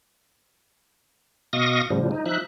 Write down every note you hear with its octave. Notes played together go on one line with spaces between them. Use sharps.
B2 D#5 F5 C#6 D#6 A#6
A2 C#3 F3 G3
D#4
F3 D#4 E5 F#6